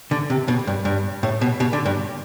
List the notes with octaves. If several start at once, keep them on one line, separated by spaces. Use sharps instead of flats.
D3
C3
B2
G2
G2
A2
B2
B2
D3
G2